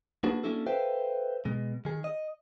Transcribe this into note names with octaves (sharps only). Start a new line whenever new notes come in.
A#3 B3 D4 F#4 G#4
A#3 C#4 D4 E4 F#4 A4
A4 B4 C5 E5 F5 G5
B2 G#3
D#3 G#4
D#5